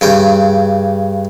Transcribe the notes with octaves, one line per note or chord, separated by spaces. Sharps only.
G2 C#3 G5